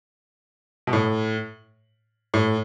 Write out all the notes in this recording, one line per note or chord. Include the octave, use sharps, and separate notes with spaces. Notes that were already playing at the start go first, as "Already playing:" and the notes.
B2
A2
A2